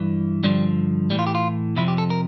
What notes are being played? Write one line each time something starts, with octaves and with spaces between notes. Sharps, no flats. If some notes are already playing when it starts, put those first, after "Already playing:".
Already playing: G2 E3
G2 D3 F3 G3
A2 E3 G3
F4
G4
F4
F2 C3 F3 E4
G4
A4
A#4